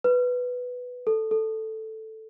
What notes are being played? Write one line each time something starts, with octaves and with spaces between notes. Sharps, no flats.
B4
A4
A4